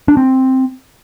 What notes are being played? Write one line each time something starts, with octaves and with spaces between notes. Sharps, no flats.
D4
C4